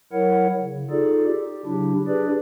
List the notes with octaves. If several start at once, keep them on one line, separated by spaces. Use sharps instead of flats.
F#3 E4 A#4 C#5 F#5
C#3
D#4 F4 G#4 A4 D5
G4
C#3 F#3 D4 E4 G4
D4 G4 G#4 B4 D5